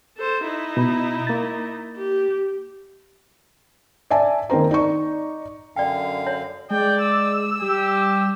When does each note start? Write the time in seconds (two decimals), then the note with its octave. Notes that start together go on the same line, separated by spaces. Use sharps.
0.18 A4 C5
0.46 D#4 E4
0.77 B2 B5
1.27 A#3 A6
1.96 G4
4.10 D5 E5 G#5 A5
4.50 D#3 A#3 C4 C5 A#5
4.71 D#4 D5 D#5 C#6
5.76 F#2 D3 D5 F5 G5
6.27 C#5
6.71 G#3 D5 G5
7.01 E6
7.61 G3 G4